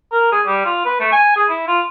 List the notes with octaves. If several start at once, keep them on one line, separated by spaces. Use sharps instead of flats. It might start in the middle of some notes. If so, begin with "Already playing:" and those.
A#4
G#4
G3
F4
B4
A3
G#5
G#4
E4
F4